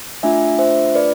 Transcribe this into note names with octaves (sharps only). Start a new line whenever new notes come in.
A3 D4 F4 E5 G#5
C5 E5
B4 D5